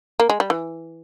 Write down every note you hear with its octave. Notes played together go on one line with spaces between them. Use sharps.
A#3
G#3
G3
E3